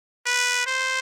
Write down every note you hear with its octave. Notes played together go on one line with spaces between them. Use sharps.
B4
C5